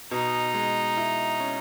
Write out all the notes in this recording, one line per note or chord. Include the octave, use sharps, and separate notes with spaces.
B2 D#4
G#3
E4
C#4